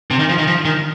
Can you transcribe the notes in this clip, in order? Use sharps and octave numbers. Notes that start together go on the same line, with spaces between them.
C3
D#3
F3
D#3
F3
D#3